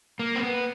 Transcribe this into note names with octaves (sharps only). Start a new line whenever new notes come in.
A#3
C4
B3